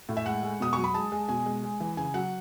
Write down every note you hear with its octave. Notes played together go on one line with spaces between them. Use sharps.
A2
E5
G#3 F#5
G#3
B2 D#6
F#3 C#6
B5
G#3 A5
G#3
B2 G#5
G#3
G#3
E3
C#3 G#5
F#3 F#5